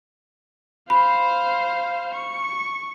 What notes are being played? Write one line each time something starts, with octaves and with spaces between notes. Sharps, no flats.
C5 F5 B5
C#6